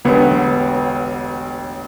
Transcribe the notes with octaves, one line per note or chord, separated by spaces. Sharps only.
E1 A1 D3 B3